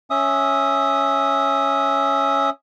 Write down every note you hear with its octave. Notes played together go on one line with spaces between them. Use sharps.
C#4 E5 D#6